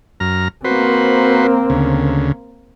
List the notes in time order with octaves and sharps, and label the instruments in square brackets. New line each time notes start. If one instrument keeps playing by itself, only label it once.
[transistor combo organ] F#2 A#5 F6
[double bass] A#3 C4 [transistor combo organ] F#4 B4 C5
[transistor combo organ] D2 C#3